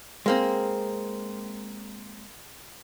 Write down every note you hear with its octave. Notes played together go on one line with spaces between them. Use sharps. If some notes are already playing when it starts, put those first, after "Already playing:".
G#3 A#3 C4